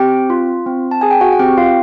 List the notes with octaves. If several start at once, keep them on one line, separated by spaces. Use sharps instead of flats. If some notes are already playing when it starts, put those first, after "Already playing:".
Already playing: C4 G4 G5
F4
C4
A5
G#4 G#5
G5
F#4 F#5
F#5
C4 G4 G5
F4 F5